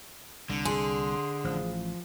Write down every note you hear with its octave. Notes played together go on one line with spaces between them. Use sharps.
C2 D3
G#4 C6
A1 F3